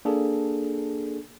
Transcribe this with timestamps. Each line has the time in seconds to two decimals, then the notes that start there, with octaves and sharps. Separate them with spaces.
0.05 A#3 D4 G#4 A4